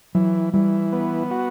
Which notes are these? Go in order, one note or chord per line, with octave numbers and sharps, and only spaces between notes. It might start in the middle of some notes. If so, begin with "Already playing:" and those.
E3 F#3
E3 G3
B3
F#4